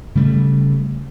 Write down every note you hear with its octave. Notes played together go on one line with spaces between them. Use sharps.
C#3 G3 A3